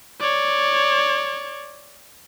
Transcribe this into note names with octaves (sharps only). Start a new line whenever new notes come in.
C#5 D5